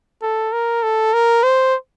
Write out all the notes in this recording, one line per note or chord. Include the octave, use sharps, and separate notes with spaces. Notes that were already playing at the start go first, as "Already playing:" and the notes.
A4
A#4
A4
A#4
C5